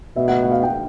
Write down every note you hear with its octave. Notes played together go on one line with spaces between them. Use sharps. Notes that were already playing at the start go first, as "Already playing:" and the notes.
B2 E5
F#5
F#5
F5
F#5
G5